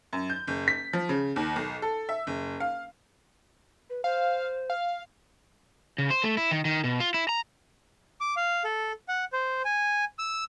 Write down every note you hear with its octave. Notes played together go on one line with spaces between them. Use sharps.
F#2
G6
F#1
B6
F3
C#3
D#2
B1
A4
E5
F#1
F5
B4
C5 F5
F5
C#3
C5
A3
E4
D#3
D#3
B2
F4
E4
A#5
D6
F5
A4
F#5
C5
G#5
E6